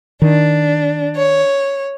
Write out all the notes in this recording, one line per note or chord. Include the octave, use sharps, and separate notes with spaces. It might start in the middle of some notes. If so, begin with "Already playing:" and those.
D#3 D4
C#5